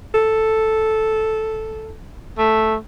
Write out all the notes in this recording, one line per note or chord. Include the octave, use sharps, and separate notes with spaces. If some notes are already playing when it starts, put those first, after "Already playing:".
A4
A3